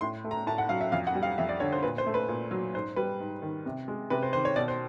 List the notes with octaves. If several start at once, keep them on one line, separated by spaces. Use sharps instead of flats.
A2 C6
A3
A#5
A2 A5
F#5
F#3 F5
E5
F2 F5
F#5
G3
F5
F2 E5
D5
D3 C#5
C5
A#2 B4
C5
A3
B4
A#2
F#3
G#2 C5
G3 B4
G#2
D#3
C3
G#3
C3 B4
C5
D#3 C5
C#5
B2 D5
C5